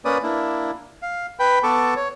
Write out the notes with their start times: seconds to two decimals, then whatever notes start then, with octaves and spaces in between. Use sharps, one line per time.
0.05 A#3 C#4 B4 D5 D#6
0.23 A#3 D4 E4
1.02 F5
1.39 B4 G5 B5
1.63 B3 A4 A5 C#6 D6
1.96 C#5